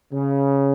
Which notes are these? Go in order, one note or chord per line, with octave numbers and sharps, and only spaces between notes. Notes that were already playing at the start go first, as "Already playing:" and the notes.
C#3